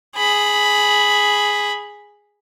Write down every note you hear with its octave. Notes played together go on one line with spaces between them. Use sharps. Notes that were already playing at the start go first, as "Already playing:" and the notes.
G#4 B5